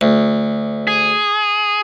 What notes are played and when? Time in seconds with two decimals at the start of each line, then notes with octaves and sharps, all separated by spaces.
0.01 D2
0.87 G#4